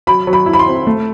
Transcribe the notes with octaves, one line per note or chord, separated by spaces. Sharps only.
F#3 B5
F#3
B5
E4
B5
C6
C4
A3